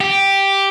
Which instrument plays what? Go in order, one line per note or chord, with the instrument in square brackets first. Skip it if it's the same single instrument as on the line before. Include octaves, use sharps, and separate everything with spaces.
[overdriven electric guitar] G4